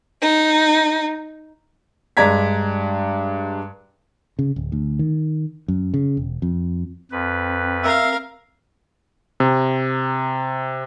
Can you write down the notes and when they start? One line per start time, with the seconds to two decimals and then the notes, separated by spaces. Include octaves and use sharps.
0.21 D#4
2.17 G2 G#3 D5 A#5 G#6 B6
4.39 C#3
4.56 D1
4.72 D2
4.99 D#3
5.68 F#2
5.94 C#3
6.17 E1
6.42 F2
7.11 F2 C4 B4
7.84 A#4 E5 F5
9.40 C3